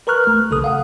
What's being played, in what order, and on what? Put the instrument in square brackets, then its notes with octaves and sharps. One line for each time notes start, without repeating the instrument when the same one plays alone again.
[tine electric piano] A#4 B4 A#5 C#6 F6 F#6
A1 A3
B1 C#3 A4 D#6
F5 F#5